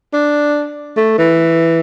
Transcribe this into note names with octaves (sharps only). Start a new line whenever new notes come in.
D4
A3
E3